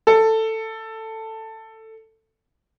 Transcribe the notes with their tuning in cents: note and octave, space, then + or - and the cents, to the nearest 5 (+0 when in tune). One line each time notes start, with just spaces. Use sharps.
A4 +10